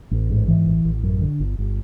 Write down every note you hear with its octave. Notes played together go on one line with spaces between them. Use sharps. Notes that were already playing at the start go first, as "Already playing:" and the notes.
A1
G#2
E3
A1
A1
F#2
D3
G1
G1